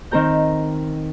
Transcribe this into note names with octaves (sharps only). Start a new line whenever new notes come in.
D#3 C4 A#4 A#5 G6